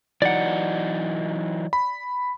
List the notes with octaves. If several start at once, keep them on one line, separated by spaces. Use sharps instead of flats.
E3 F#3 D#4 D5 F#5
B5